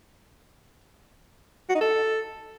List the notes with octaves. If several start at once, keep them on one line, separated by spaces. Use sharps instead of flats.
F#4
D#4
A4